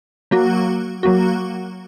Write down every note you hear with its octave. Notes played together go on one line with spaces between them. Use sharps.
F#3 A#3 F#4
F#3 A#3 F#4